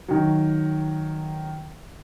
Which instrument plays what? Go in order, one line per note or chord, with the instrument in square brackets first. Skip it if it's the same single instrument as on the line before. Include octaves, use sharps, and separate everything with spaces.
[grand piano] D#3 F#3